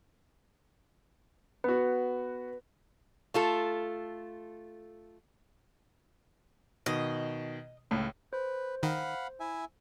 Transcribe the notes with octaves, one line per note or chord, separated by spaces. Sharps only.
B3 F#4 B4
A3 F4 A4
B2 D#3 D#5
C#2 A2
B4 C5
D#3 F5 F#5 B5
E4 E5 G#5